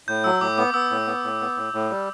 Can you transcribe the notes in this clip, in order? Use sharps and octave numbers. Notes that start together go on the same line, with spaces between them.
A2 G6
F#3 E6
A2 D6
B3 D6
B3 E6
A2
B3
A2
B3
A2
A2
G3